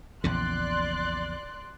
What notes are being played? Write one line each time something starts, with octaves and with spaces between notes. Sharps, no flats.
A#1 E2 C#3 D5 C6 F#6